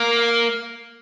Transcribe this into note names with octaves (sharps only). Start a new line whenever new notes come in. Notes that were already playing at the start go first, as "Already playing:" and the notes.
Already playing: A#3